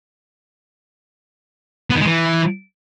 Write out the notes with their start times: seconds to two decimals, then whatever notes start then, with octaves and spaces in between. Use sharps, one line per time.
1.90 B3
1.95 D#3
2.01 G#3
2.06 E3